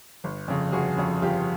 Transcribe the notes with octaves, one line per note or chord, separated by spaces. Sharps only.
G1
F2 C#3
G1 F#4 G#4
F2 C#3
G1 F4 G4